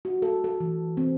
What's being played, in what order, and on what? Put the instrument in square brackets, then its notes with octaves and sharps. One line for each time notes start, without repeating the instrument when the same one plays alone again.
[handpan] F#4
A4
A4
E3
C4